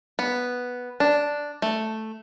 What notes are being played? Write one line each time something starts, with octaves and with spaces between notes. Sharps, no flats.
B3
D4
A3